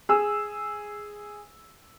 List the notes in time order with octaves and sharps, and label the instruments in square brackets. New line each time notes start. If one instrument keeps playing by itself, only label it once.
[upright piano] G#4 E6